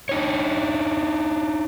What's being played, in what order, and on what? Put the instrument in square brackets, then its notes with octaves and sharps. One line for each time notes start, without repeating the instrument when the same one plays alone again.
[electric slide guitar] D4 D#4 C#5